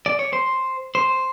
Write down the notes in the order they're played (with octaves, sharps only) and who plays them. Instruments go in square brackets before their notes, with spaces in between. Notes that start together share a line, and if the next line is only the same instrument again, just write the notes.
[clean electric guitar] D5
C#5
C5
C5